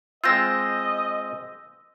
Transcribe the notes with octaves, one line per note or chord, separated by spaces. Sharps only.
G#3 C4 F4 D#5 E6 G6 A#6